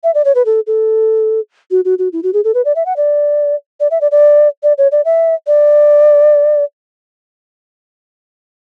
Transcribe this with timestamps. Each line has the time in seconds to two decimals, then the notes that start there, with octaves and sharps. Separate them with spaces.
0.04 E5
0.15 D5
0.25 C#5
0.35 B4
0.46 A4
0.67 A4
1.71 F#4
1.85 F#4
1.99 F#4
2.13 E4
2.23 F#4
2.34 G#4
2.44 A4
2.54 B4
2.65 D5
2.76 E5
2.86 F#5
2.97 D5
3.80 D5
3.91 E5
4.01 D5
4.12 D5
4.63 D5
4.78 C#5
4.92 D5
5.05 E5
5.47 D5